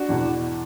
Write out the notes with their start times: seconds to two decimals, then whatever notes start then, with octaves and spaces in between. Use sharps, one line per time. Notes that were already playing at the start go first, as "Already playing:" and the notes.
Already playing: D4 F#4
0.09 E2 B2